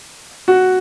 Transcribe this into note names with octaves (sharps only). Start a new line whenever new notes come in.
F#4